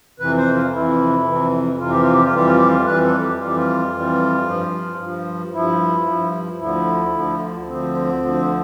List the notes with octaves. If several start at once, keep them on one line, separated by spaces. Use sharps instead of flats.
F2 C3 E3 B4
C5
F4
F2 C3 E3 E4
F2 C3 E3
F2 C3 E3 F4
G4
F4
G4
F4
F2 E3 G3 G4
F4
G4
F4
F2 E3 G3 B4
A4
G4
F2 E3 G3 F4
G4
F4
F2 E3 G3
G2 F3
G2 F3
G2 F3 E4
G2 F3
D2 D3 F3 E4
D2 D3 F3
D2 D3 F3 C4
D2 D3 F3